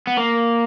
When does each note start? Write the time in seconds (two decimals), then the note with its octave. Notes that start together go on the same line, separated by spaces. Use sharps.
0.07 B3
0.17 A#3